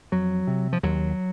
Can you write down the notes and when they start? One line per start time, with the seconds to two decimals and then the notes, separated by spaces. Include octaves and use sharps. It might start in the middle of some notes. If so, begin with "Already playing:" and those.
0.12 F2 F#3
0.47 C3
0.73 F3
0.83 D#2 F#3